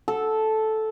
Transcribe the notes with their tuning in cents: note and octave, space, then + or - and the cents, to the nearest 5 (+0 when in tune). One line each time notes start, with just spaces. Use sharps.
A4 -10